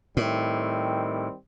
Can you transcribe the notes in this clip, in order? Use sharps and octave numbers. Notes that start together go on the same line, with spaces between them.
A2 D#3 G3 C4